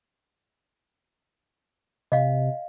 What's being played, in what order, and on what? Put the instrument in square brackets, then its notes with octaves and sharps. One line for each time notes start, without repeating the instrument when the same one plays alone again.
[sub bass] C3 [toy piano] D#5 F5